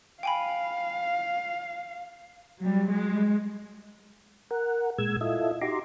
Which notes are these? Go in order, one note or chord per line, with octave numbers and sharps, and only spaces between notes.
F5 G5 G#5 B5
F#3 G3
G#3
A#4 F#5
A#2 G#3 E6 G#6
E4 F4 A4 D#5 E5
D#4 F#4 G4 A#5 C6 D6